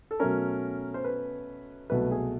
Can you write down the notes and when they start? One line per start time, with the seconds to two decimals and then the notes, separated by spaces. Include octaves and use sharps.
0.11 A4
0.20 B2 F#3 A3 C#4 A#4
0.94 C5
1.05 B4
1.90 C2 B2 F#3 A3 B4
2.11 G#4